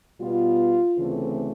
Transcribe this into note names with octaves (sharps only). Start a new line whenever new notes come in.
B2 G3 B3 F4
D2 C#3 E3 A3 C4